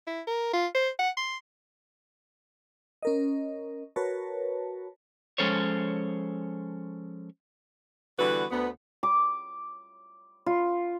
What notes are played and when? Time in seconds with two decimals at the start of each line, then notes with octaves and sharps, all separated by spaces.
0.07 E4
0.27 A#4
0.53 F4
0.75 C5
0.99 F#5
1.17 C6
3.03 C#4 A#4 D#5
3.96 F#4 A#4 B4 C#5 A5
5.38 F3 G#3 C#4 A4 C5 C#5
8.19 D3 E3 G3 B3 F#4 B4
8.51 D2 B3
9.03 D6
10.46 F4